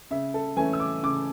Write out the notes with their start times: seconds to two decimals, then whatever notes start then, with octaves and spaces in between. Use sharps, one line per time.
0.11 C#3 E5
0.34 A4
0.56 E3 A3 C#4 G#5
0.73 E6
0.80 D6
1.03 C#3 D6